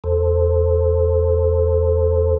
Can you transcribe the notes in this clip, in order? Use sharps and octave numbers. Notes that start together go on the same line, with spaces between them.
E2 A4 C5